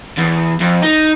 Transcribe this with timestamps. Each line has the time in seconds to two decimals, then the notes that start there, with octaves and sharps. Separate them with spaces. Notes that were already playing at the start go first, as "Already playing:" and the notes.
0.17 E2
0.60 F2
0.82 D#4